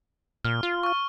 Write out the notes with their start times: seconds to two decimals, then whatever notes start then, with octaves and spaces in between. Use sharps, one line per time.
0.45 A#2 F6
0.63 F4
0.83 C#6 F6